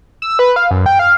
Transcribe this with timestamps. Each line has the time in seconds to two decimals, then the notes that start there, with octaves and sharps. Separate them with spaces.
0.22 E6
0.39 B4
0.56 F5
0.71 F#2
0.86 G5
0.99 F5